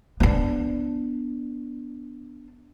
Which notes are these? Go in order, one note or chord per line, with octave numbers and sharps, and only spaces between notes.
B3 D4